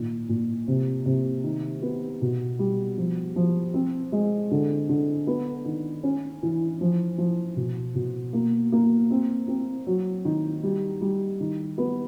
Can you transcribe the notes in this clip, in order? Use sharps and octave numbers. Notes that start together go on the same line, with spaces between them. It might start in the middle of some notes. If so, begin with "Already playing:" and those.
Already playing: A#2 D#3
A#2
C3
C3
D#3
B3
B2
G3
F3
F3
C4
G#3
D3
D3
B3
D#3
C#4
E3
F3
F3
B2
B2
A#3
A#3
C4
C4
F#3
D#3
G3
G3
D#3
B3